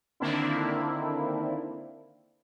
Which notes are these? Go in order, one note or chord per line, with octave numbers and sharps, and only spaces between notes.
D3 D#3 A#3 C4 D4 E4